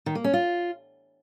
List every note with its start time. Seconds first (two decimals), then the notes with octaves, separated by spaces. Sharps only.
0.06 D#3
0.15 A#3
0.24 C#4
0.33 F4